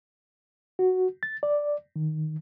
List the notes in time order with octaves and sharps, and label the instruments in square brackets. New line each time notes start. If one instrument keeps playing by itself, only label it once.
[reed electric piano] F#4
A6
D5
D#3